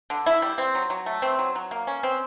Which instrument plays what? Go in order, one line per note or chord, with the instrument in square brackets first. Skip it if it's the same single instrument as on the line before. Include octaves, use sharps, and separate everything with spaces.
[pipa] D3
E4
G3
C4
F#3
F#3
A3
C4
F#3
F#3
A#3
C#4
C4